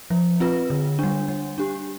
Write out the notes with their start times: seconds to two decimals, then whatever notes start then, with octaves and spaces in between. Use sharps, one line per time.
0.10 F3
0.40 C4 F4 B4
0.70 D3
0.99 G3 D4
1.28 G3
1.58 D4 G4